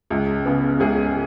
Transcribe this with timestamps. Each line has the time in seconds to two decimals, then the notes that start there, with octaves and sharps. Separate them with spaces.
0.10 C#2
0.46 C#3 B3
0.80 C#2 G#4